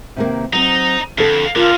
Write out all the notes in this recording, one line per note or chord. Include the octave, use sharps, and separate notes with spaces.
C3 D#3 A#3
F#3 C4 D#4
F2 D3 A4
F2 D3 F4 A#4